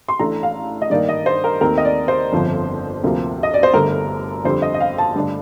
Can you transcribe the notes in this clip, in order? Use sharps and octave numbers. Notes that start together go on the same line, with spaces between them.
C6
A1 A2 A3 D4 A#5
F5
D#5
G2 D#3 A#3 D#4 D5
D#5
C5
A#4
D#2 D#3 A3 C4 A#4
D#5
D5
C5
G1 F2 D3 F3
D2 C3 F3 A#3
D#5
D5
C5
G1 G2 D3 A3 A#4
F2 D3 G3 C5
D#5
D#5
F5
A5
G2 D3 A3 D4